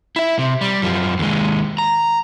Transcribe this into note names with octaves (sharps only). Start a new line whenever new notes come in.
E4 E5
C3
G3
F#2 F3
D#2 G#3
A#5